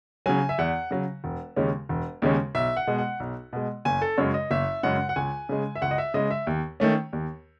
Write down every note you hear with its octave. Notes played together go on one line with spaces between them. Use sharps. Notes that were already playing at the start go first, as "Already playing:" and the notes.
C#3 F#3 G#5
E5
E2 F#5
C#3 F#3
E1
D#2 C#3 G#3 C#4
E1
D#2 C#3 G#3 C#4
B1 E5
F#5
B2 G#3
F#5
B1
B2 G#3
F#1 G#5
A4
F#2 C#3 G#3 C#5
D#5
F#1 E5
F#2 C#3 G#3 F#5
F#5
C#2 G#5
C#3 G#3
E5
C#2 F#5
D#5
E5
C#3 G#3 D#5
E5
D#2
D#3 A3 C#4
D#2